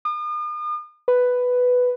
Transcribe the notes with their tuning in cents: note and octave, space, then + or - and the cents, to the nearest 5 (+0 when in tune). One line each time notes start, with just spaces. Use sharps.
D#6 -45
B4 +5